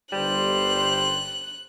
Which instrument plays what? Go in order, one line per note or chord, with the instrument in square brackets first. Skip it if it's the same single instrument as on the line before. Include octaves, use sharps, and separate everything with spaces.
[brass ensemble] G1 C5 [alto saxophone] G3 [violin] F#6